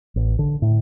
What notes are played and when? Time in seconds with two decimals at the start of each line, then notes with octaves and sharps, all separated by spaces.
0.16 A1
0.39 D3
0.62 A2